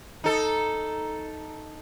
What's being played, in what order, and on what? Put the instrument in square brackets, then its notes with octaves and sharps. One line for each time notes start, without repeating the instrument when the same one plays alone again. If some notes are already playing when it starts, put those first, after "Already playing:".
[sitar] D#4 A4